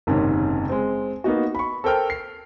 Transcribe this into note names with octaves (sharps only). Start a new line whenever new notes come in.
F#1 G#2 C3 D#3 C#4
G#3 C4
A#3 B3 D#4 F#4
B5 C#6
A4 A#4 C5 G5 A5 F6
C7